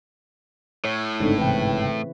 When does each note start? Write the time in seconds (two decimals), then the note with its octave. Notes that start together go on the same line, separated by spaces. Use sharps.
0.85 A2 C#5
1.20 G1 G#2 C#3 C4 D4 D#4 A4
1.38 C2 C3 E3 B4 G5